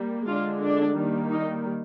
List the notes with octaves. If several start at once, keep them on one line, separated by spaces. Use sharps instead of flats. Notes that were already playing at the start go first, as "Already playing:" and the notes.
Already playing: G3 A#3
D3 G#3 D4 F4
D4
D#3 G3 A#3
D#4